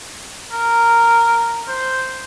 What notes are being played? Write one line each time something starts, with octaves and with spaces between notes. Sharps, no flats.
A#4
C5